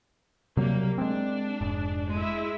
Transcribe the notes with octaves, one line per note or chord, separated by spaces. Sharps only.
C3 F#3 G3 A#3
G#3 C4 D4
F1 G#2
G#3 E4